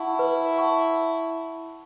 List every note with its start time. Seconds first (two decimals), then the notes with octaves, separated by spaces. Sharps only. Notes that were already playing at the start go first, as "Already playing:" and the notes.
Already playing: E4 F#5 A5 C#6
0.19 B4
0.56 F#5 A5 C#6